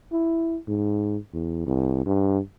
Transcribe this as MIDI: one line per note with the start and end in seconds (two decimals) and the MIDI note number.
0.13 0.57 64
0.68 1.17 44
1.33 1.64 40
1.66 2.02 36
2.06 2.39 43